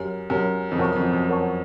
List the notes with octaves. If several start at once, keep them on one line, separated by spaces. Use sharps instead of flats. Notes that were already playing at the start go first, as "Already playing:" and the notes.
Already playing: F#2 G4 A#4 C#5
F#2 G4 A#4 C#5
F2
F#2 A#4 C#5 F#5 A5 C#6
F2
F#2
A#4 C#5 F#5 A5 C#6